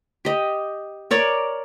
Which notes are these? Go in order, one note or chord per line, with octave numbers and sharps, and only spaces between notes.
G4 D#5
A#4 C#5 D5